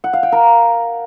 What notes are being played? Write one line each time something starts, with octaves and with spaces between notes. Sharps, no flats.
F#5
F5
G5
A#4